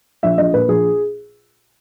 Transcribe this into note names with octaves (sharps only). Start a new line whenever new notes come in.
A#1 E5
A#1 D#5
A#2 B4
A#1 G#4